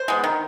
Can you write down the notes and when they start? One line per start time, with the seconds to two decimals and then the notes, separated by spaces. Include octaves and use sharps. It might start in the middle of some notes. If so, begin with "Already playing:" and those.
Already playing: C5
0.08 G#3 B3
0.24 D#3